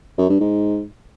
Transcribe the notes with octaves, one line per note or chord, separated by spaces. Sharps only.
F#2
G2
G#2